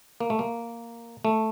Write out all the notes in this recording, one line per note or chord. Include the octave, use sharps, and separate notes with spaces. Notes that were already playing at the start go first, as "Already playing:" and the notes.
A#3
A3
A#3
A3